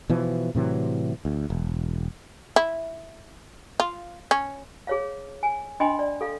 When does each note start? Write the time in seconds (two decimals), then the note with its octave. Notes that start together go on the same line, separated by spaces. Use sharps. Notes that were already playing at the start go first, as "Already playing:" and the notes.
0.10 B2 E3 F3
0.55 A2 C3 E3 F#3
1.25 D2
1.50 E1
2.56 E4
3.80 F4
4.31 C#4
4.87 G#4 C#5 F5
5.43 G#5
5.80 D4 D#5 G5 G#5 B5 C6
5.99 D5
6.21 A4 F5